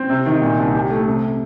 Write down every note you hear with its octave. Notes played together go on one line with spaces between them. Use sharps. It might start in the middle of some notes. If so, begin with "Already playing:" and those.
Already playing: C4
C3
D#3
A#2
C2
G4
A3
C3